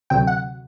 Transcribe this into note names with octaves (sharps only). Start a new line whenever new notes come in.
D2 C3 F#3 G5
F#5